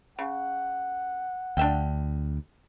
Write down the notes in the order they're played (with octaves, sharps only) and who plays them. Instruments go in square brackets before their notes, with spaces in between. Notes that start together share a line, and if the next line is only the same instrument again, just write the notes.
[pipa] C#3 [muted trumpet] F#5
[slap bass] D2 [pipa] D4 E5 G5